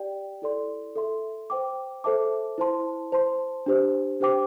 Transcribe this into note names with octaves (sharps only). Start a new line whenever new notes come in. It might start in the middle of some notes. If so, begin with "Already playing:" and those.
Already playing: G4 D5 G5
E4 A4 D5 C6
A4 E5 C6
C5 G5 D6
A4 C5 E5 A5 D6
E4 C5 A5 C6
C5 A5 C6
D4 G4 C5
D4 G4 C5 G5 D6